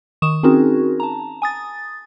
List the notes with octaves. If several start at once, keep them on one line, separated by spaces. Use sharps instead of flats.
D#3 C#6 D#6 E7
C4 C#4 D#4 F#4 G#4 A#4
A5 A#5
G#5 D#6 A6